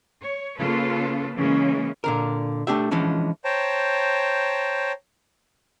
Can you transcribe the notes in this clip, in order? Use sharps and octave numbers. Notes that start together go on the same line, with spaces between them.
C#5
C#3 A#3 F4 A4 B4
C#3 E3 G#3 A#3 C#4
A#2 D3 A#4
A3 D4 G4 E5
E3 F3 G#3 C#4 D4
C5 C#5 G5 A5 A#5